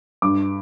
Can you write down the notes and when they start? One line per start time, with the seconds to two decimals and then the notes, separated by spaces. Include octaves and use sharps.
0.22 G2 D6